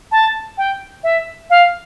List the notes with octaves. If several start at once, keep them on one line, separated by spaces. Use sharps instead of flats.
A5
G5
E5
F5